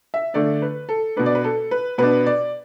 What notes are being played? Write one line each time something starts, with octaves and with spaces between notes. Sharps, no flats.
E5
D3 A3 D4 D5
B4
A4
B2 B3 D4 B4
D5
B4
A4
B4
B2 B3 D4 B4
D5